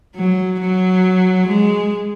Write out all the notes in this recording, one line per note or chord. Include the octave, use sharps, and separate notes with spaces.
F#3
F#3
G#3